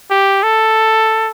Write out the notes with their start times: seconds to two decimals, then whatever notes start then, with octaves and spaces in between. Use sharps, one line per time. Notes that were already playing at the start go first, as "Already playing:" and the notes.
0.11 G4
0.43 A4